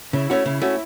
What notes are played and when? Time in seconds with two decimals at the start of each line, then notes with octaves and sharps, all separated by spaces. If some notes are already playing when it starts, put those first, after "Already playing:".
0.13 C#3 E4
0.30 A3 C#4 F#4
0.46 C#3
0.62 A3 C#4 F#4